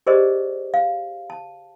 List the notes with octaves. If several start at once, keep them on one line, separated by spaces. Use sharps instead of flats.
G4 G#4 A#4 C5 D5 D#5
F5
A5